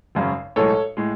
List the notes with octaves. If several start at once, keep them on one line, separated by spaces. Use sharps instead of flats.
G#1 F#2 C#3
B1 A2 G#3 A4 C#5
A2 G#3